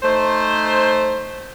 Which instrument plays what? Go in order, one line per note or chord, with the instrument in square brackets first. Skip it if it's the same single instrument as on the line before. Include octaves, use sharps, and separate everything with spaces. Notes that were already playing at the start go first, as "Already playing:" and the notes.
[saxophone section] A3 D#4 C5